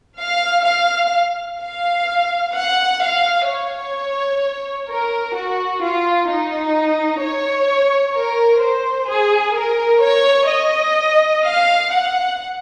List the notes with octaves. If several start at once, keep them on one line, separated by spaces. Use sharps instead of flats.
F5
F5
F5
F#5
F5
C#5
A#4
F#4
F4
D#4
C#5
A#4
C5
G#4
A#4
C#5
D#5
F5
F#5